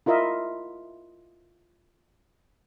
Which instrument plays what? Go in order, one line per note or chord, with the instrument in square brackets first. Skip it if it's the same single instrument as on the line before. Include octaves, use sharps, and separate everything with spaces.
[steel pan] E4 F4 A#4 D#5 E5